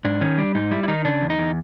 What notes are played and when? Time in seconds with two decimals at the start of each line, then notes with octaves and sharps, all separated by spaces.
0.05 G#2 D4
0.21 D#3 C#4
0.38 G3 D4
0.55 G#2 D#4
0.71 G3 E4
0.83 E4
0.88 D#3 D#4
1.05 C#3 D4
1.21 E2
1.30 D#4
1.38 E2